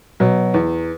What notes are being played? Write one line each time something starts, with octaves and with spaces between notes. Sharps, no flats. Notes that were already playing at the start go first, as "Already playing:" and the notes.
B2 F#3
E2